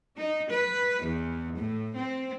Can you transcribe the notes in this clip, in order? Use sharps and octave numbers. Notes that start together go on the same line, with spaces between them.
D#4
B4
E2
A2
C4